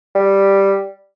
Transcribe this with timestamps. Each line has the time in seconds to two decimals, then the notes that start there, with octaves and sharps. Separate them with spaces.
0.15 G3